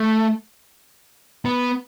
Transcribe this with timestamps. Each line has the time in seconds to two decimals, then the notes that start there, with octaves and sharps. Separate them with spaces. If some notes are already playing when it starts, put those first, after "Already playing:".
Already playing: A3
1.45 B3